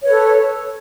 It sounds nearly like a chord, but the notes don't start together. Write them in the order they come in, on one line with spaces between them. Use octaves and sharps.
C#5 B4 A4